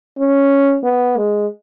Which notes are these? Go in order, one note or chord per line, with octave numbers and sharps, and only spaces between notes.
C#4
B3
G#3